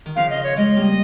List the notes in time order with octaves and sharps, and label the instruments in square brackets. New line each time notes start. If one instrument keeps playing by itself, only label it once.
[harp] D#3
[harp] C#3 F3 [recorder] F5
[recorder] D#5
C#5
[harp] F3 G#3 [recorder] D#5
[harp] G3 A#3